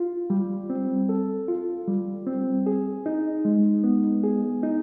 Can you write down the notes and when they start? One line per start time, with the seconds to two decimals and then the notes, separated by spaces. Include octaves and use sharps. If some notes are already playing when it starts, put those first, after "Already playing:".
Already playing: F4
0.30 G3
0.70 C4
1.09 A4
1.48 F4
1.88 G3
2.27 C4
2.66 G#4
3.06 D#4
3.45 G#3
3.84 B3
4.23 G#4
4.63 D#4